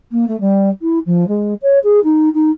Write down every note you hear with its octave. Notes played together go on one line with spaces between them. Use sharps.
A#3
A3
G3
E4
F3
G#3
C#5
G#4
D#4
D#4